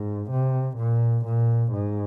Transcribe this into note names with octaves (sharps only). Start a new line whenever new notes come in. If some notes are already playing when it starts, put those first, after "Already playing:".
Already playing: G#2
C3
A#2
A#2
G#2